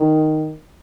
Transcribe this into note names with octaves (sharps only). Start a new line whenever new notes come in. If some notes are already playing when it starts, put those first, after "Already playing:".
Already playing: D#3